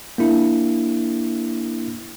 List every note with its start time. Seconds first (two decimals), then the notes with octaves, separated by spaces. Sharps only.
0.18 A#3 D4 E4